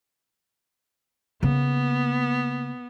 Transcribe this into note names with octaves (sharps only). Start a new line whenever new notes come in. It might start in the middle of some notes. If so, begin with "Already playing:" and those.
C#3 A#3 B3